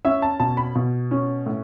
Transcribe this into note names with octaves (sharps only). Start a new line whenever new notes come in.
C#4 E5
A5
B2 A5
B5
B2
C#4
A2